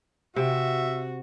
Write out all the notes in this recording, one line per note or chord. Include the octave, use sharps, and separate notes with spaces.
C3 F#4 E5